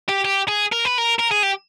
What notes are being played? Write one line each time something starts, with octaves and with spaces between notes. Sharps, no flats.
G4
G4
G#4
A#4
B4
A#4
A#4
G#4
G4